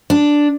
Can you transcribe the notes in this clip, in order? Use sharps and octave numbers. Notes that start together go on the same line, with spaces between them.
D4